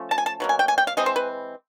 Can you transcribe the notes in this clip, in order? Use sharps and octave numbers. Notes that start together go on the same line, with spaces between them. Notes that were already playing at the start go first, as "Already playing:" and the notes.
Already playing: F3 A3 C#4
A5
G#5
A5
B2 F#3 A#3
G#5
G5
G#5
G5
F5
E3 G#3 C4 D#5
C5
B4